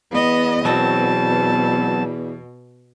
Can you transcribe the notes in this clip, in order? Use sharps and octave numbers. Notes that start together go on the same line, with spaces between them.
E2 B3 D#5
B2 F#3 C4 A5